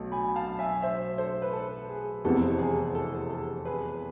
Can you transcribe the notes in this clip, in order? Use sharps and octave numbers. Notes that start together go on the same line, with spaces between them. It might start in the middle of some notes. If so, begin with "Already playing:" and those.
Already playing: B1 A3 A5
G#5 B5
F5 A5
E5 G#5
C5 E5
A4 C5
B4
A4
G#4
F1 E2 C3 E3 B3 A4
G#4
A4
A4
G#4 B4